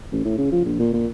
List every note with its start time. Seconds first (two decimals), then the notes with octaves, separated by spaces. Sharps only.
0.12 A1
0.25 A2
0.38 C#3
0.52 F3
0.65 A#1
0.79 A#2
0.93 A#2